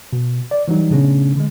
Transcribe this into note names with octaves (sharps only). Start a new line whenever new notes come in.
B2
D5
E3 F#3 G3 D#4
A#2 C#3 A3 B3 C#4 D4
D3 G#3